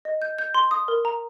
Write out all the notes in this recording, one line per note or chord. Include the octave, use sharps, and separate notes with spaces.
D#5
G6
G6
C6
D#6
A#4
A#5